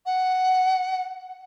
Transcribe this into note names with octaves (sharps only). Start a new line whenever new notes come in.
F#5